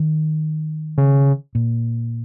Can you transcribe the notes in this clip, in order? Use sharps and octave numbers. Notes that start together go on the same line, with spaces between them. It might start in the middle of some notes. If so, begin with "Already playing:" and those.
Already playing: D#3
C#3
A#2